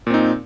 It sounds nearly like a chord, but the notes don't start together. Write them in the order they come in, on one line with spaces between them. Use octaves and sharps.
A#2 C4 D#4